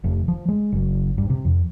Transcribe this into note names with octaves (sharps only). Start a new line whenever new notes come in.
F1
F3
G#3
F#1
G2
C3
F2